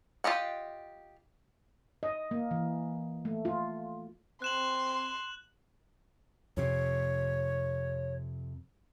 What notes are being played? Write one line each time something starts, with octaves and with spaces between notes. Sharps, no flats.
F4 G4 D#5 F#5
D#5
A#3
E3
A3
F4
C4 C6 F#6 E7 F#7
F2 C3 C#5